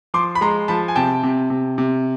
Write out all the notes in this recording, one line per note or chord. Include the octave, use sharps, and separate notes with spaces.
F3 C6 D6
B5
G#3 A#5 C6
F3 A5 B5
G#5
C3 G5 A5
C3
C3
C3